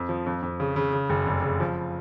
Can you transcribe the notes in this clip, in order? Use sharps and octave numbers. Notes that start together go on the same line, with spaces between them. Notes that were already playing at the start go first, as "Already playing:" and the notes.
Already playing: F2
F3
F2
F2
C#3
C#3
C#3
F#1
F1
C#3
F3